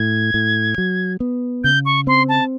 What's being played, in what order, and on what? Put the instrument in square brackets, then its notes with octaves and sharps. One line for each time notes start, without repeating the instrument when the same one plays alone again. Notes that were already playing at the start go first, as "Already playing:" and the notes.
Already playing: [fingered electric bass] A2 [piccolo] G#6
[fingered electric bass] A2
F#3
B3
[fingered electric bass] C#3 [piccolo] G6
[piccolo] C#6
[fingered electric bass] C4 [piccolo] C6
[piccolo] A5